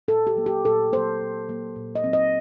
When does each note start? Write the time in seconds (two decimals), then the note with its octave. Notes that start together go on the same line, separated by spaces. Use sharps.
0.08 A#2 A4
0.27 G4
0.37 F#3 A#3
0.46 G4
0.65 A#2 A4
0.92 F#3 A#3 C5
1.21 A#2
1.49 F#3 A#3
1.76 A#2
1.95 D#5
2.04 F#3 C4
2.13 D#5